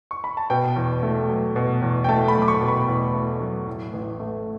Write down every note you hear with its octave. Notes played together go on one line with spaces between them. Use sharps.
C#6
B5
A5
B2 G5
E2
A3
F#3
B2
E2
G5
A3 A5
B5
F#3
D6
C#6
B2
B5
E2
A3
F#3
A2
A1
A3